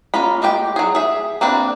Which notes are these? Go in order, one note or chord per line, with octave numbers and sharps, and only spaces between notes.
A#3 C#4 F4 B5
G#3 F#4 G4 G5
F#3 G#4
G#4 E5
A#3 C4 D4 B4